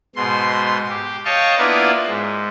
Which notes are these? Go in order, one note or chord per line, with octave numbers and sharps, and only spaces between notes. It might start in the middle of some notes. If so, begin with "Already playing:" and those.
G#2 B2 C6
G4
C#5 D#5 F5 G5 A5 C#6
A#3 B3 D4 E4 F4 B4
G#2